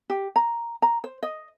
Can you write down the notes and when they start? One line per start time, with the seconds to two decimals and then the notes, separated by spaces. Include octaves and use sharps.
0.10 G4
0.36 A#5
0.82 A#5
1.04 C5
1.23 D#5